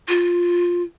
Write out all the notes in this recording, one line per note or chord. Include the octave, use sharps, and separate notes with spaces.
F4